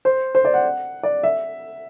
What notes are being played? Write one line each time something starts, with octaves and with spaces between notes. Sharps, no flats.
C5
C5
D5
F#5
D5
E5